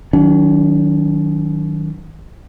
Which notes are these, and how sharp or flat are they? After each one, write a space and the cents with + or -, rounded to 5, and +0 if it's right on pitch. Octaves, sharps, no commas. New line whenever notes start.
D#3 +10 F#3 +5 D4 -45